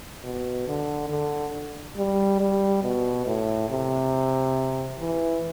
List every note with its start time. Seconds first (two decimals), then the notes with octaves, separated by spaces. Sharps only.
0.24 B2
0.67 D3
1.10 D3
1.97 G3
2.40 G3
2.83 B2
3.27 A2
3.70 C3
4.99 E3